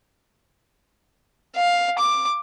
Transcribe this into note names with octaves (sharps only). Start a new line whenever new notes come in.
F5
D6